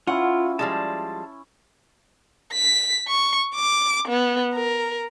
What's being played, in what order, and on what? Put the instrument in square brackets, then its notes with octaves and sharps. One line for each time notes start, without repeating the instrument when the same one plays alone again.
[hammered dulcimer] C#4 E4 [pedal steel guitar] F4 [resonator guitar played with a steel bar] F#5
[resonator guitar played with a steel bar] F3 G3 G#3 [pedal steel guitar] A5
[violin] B6
C#6
D6
B3
A#4